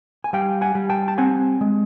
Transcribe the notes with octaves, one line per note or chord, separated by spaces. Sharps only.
G#5
G3 F5 G5
F#5 G#5
G3
G5 A5
A5
C4 F#5 G#5
G#3